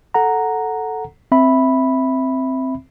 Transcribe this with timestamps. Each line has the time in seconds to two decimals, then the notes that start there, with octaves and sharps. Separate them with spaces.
0.14 A4 F#5 A#5
1.32 C4 E5 B5